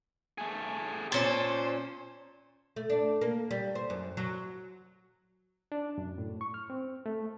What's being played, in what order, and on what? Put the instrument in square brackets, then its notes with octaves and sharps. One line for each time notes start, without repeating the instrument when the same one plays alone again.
[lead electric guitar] A3 G#4
[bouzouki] A#2 C#4 A5 [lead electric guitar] C5
[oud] A3
D4
A#3
G3
C5
F#2
F#3
[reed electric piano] D4
F#2
A2
C#6
F6
C4
A3